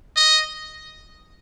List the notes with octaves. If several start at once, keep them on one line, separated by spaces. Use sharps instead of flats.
D#5